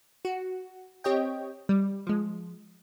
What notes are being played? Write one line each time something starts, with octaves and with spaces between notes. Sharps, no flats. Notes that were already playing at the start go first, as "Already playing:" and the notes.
F#4
C4 G4 C#5 D#5 G5
G3
F3 G#3